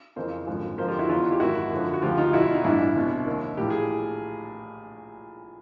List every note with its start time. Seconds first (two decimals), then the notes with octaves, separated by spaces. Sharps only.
0.16 F2 C#3 E3 A#4 C5
0.47 G#1 F#2 D3 F3
0.78 F2 D3 F3 A#4 C5
0.88 F4 G4
0.99 E4 F#4
1.09 E2 C#3 E3 D#4 F4
1.32 G4
1.40 G#1 F#2 D#3 E4 F#4
1.71 F#2 D3 F3
1.94 F#4
2.02 D2 C#3 F3 F4 G4
2.17 D#4 F4
2.33 E2 B2 E4 F#4
2.54 D#4
2.64 A1 G2 E3 D4 E4
2.96 C2 B2
3.26 D#2 D#3
3.57 A#1 A2 E3 G4
3.70 G#4